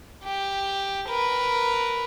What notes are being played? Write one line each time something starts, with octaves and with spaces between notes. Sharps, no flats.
G4
A#4 B4